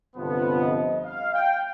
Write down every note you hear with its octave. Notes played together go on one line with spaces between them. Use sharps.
G1 F2 C3 F3 B3
D#5
F5
G5